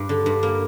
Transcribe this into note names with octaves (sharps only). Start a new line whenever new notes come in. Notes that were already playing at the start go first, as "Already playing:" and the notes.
Already playing: G2
D3
G2
A#3